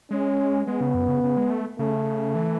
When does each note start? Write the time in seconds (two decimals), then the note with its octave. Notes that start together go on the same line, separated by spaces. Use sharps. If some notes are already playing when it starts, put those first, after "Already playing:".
0.10 G#3 C#4
0.66 G#3 B3
0.81 C#3
0.94 F#2
1.08 C#3
1.24 C#3
1.37 G#3
1.51 A3
1.79 C#3 A3
2.35 E3